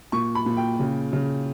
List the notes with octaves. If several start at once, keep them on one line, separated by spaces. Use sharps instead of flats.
A#2 C#6
B5
A#2
G5
C#3
C#3